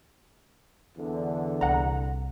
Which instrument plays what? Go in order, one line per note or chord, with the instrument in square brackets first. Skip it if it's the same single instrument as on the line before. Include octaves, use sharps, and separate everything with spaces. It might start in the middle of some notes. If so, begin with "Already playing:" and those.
[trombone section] E2 D3
[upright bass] C2 [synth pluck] F#5 A#5